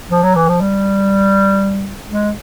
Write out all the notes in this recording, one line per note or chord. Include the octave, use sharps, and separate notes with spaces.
F3
F#3
E3
F3
G3
G#3